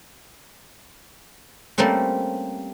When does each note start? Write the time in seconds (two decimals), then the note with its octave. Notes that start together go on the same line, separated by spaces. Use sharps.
1.78 G3 A3 A#3 C4 C#4